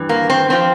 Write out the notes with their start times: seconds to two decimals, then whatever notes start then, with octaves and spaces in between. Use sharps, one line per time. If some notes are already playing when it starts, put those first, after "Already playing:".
Already playing: G2 E3
0.09 A#3
0.30 C4
0.50 F3 C4